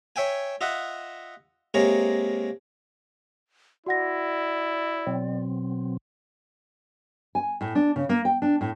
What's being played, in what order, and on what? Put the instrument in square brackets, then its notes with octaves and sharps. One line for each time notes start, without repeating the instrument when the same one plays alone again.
[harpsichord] C#5 E5 G5 G#5
F4 D#5 E5 F#5
C3 G#3 A#3 C#5 A#5
[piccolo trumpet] E4 [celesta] F#4 F#5 A#6 [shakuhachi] D5
[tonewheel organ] B2 F#3 C4
[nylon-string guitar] G#5
A2
D4
C#3
A#3
G5
D4
A2